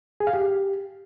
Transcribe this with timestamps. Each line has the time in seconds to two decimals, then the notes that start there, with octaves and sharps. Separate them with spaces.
0.20 G#4
0.27 F5
0.33 G4